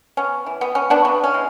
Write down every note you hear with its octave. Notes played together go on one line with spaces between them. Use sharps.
B3 C#4
E3
B3
B3 C#4
B3 D4
C#3 B3
C#4
E3 G#3